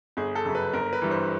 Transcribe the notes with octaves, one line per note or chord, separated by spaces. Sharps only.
G1 G#4
A4
F#2 C#3
B4
G1 A#4
B4
G2 E3
C5